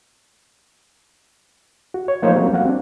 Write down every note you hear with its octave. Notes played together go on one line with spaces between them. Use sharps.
F#4
C#5
F3 A3 A#3 D#4 C5 C#5
F#3 G3 A#3 C4 C#4 D#4
G3 A#3 F#4 F5 F#5
C4 D4